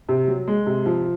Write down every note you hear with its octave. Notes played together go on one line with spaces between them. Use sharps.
C3
F#3
G#3
C3
F3